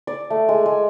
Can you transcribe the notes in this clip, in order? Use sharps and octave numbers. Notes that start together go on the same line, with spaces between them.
D5
A3
G#3
G#3